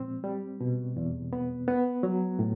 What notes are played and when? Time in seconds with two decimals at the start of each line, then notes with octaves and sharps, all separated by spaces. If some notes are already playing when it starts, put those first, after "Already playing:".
Already playing: A#2 F3 G#3 C4
0.24 G3
0.61 B2
0.96 E2
1.33 B3
1.68 B3
2.03 F#3
2.39 A2